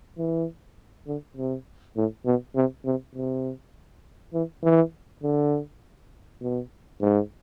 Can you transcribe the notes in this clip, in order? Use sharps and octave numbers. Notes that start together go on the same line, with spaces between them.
E3
D3
C3
A2
B2
C3
C3
C3
E3
E3
D3
B2
G#2